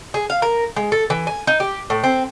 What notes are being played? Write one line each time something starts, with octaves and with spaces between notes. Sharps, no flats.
G#4
F5
A#4
G#3
A4
E3
G#5
D#4
G4
A2
C4